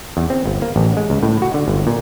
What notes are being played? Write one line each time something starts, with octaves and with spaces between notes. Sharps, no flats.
E2
C4
G1
A#3
A1
G#3
C#2
A2
F#4
D3
G1
A#2